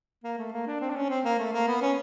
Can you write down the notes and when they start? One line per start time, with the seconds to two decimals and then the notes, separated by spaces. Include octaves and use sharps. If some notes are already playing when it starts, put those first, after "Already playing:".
0.24 A#3
0.38 A3
0.53 A#3
0.67 D4
0.81 C4
0.90 D4
0.96 C#4
1.10 C4
1.25 A#3
1.39 A3
1.53 A#3
1.68 B3
1.82 C#4